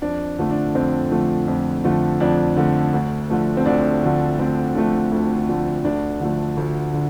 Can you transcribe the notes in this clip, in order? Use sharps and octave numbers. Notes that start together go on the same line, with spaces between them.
F2 D4
D3 F3 A3
D4
F2 C4
D3 F3 A3
F2
D3 F3 A3
F2 D4
D3 F3 A3
D2
D3 F3 A3
C4
D2 D4
D3 F3 A3
D2 C4
D3 F3 A3
D2
D3 F3 A3
D2 D4
D3 F3 A3
D2
D3